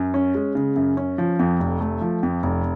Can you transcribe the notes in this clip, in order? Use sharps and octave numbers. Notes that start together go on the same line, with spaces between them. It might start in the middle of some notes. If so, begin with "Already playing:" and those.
Already playing: F#2
C#4
G#3
C#3
F#2
C#4
F3
F2
F1
A3
F3
F2
F1